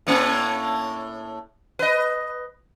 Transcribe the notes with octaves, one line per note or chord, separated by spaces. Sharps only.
A2 A#3 C#4
B4 D#5